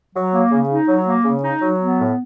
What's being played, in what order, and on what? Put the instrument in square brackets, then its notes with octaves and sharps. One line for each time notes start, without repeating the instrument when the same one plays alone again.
[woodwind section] F#3
A#3
C#3
D#4
F#3
A#3
C#3
D#4
F#3
B3
A2